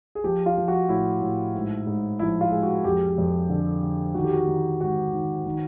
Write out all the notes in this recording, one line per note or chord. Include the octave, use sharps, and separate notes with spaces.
G#4
F3 G4
F4
F3
F#4
A2 E4
A2
G#2
G#2
F3 E4
F4
G#3
F#4
F2 G4
F2
D3
D3
D#3 F#4
G4
F#4
D#3
G#2 F#4
D#3
D#3